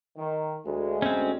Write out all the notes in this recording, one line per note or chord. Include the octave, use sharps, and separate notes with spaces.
D#3
D2 G#3
C4 C#4